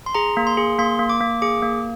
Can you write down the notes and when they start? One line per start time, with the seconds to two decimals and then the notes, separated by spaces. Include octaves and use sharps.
0.06 C6
0.15 G#4 A#5
0.37 A#3
0.47 C6
0.57 G#4
0.78 A#3 C6
0.99 A#3
1.10 D6
1.21 A#3
1.42 G#4 D6
1.62 A#3